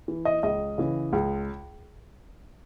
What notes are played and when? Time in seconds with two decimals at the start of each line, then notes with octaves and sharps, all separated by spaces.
0.08 E3
0.25 D#5
0.43 C#2 D#5
0.78 C#3 E3
1.13 C#2